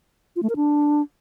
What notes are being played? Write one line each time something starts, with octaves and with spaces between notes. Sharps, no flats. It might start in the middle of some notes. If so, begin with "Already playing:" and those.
F4
A3
A#4
D4